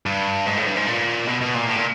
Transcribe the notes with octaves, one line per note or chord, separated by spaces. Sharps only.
G2
G#2
A2
G2
G#2
A#2
B2
B2
A#2
A2
A#2